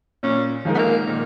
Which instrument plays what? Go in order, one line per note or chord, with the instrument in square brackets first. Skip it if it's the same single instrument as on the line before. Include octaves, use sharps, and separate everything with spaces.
[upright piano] A#2 [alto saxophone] C#4
[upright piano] F3 G#3 D#4 A#4
[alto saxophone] B3
A#3
[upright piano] A#2 [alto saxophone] D#3